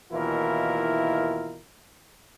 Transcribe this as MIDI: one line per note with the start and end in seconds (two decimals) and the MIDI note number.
0.12 1.59 39
0.12 1.59 47
0.12 1.59 52
0.12 1.59 64
0.12 1.59 65
0.12 1.59 70